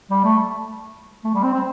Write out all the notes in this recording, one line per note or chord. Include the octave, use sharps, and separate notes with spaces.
G3
A3
A3
G3
C4
C4